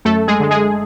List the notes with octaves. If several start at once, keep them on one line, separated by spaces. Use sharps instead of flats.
F#2 A3 A4
G#3 G#4
D3 G#3
G#3 G#4